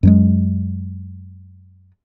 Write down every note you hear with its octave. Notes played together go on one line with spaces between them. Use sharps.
F#2 F#3 G#3